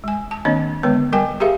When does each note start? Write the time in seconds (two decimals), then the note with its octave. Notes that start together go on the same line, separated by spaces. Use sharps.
0.04 G#3 G#5
0.31 A5
0.45 D#3 A#3 C4 D4 C#5 D#5
0.83 D3 G#3 B3 B4 C#5
1.13 G3 A#4 G5 G#5
1.40 G4 G#4 A#4 E5 F5